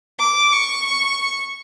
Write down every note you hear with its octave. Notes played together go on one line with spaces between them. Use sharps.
D6
C#6